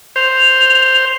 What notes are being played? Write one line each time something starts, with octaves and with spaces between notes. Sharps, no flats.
C5 F7